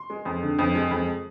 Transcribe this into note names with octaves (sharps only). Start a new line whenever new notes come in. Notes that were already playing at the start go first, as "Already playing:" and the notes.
Already playing: C6
G#3
F2
D3
F2
G#3
F2